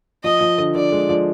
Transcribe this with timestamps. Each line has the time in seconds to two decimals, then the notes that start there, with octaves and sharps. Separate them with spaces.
0.23 F3 D#5
0.41 F3
0.58 D3
0.75 D3 D5
0.92 G#3
1.09 F3